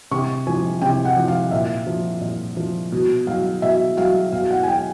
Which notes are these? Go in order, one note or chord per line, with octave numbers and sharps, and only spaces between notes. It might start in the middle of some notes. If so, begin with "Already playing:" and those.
C3 C#6
F3 G#5
C3 G5
F#5
F3
F5
A#2 E5
F3
A#2
F3
B2
F#3 F5
B2 E5
F#3 F5
B2 F5
F#5
G#5
F#3 G5